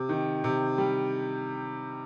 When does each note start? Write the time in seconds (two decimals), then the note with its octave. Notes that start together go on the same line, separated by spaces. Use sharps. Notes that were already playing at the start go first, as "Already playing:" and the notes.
Already playing: C3
0.09 D#3
0.44 C3
0.78 G3